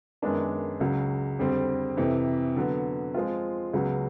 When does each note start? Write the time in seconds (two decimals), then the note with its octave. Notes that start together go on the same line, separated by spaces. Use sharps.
0.22 F#2 D#3 G#3 B3 D4
0.80 C#2 C#3 F#3
1.39 F2 D3 G3 C4
1.97 F2 C3 E3
2.56 D3 F#3 B3
3.14 F3 G#3 C4 F4
3.73 C#2 C#3 F#3 B3